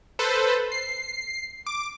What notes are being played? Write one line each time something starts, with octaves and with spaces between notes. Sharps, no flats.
A4 B4 C5
C7
D6